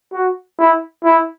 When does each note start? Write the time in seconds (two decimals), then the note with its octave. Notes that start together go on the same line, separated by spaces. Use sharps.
0.13 F#4
0.59 E4
1.05 E4